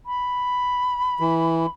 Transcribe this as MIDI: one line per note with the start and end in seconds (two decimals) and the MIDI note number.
0.06 1.69 83
1.20 1.66 52